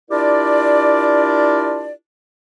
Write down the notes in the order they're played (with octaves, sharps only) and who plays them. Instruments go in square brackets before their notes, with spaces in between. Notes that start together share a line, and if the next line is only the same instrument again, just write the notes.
[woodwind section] D4 E4 F4 G4 A#4 D5